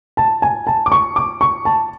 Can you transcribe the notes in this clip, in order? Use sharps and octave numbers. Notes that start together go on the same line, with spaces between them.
A5
G#5
A5
D6
C#6
D6
C#6
A5